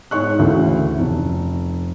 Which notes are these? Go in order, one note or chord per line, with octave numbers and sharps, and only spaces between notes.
G#2 C#5 C#6 F#6
D2 C#3 E3
F1